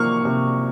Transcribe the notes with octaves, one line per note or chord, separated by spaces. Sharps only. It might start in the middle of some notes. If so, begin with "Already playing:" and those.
Already playing: C3 F3 A#3 C#6 F6
C3